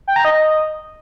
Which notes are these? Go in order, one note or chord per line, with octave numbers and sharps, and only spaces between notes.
G5
A#5
D#5